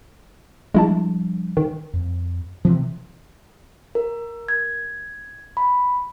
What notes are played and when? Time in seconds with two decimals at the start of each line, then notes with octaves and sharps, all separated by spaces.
0.74 F3 G3 G#3 D4 E4 A5
1.57 D#3
1.93 F2
2.65 C3 E3 F3
3.95 A#4
4.48 G#6
5.57 B5